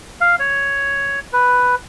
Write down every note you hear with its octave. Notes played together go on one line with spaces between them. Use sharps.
F5
C#5
B4